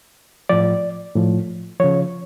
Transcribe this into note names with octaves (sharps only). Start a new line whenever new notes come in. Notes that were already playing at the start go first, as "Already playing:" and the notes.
A2 F3 D5
A2 F3
C#3 F3 C#5